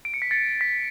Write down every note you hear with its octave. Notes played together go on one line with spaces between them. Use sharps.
D7
C#7
B6
A6 C#7
B6